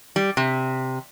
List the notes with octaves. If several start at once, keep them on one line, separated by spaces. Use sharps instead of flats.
G3
C3